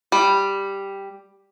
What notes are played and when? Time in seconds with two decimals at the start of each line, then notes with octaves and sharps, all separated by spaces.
0.12 G3